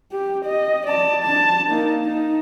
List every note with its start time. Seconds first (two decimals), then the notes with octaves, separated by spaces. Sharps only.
0.12 G4
0.45 D#5
0.87 D5 A5
1.24 D4 A5
1.68 A#3 D#4
2.05 D#4